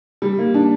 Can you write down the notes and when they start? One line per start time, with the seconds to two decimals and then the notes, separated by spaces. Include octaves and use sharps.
0.22 G3
0.38 A#3
0.54 D4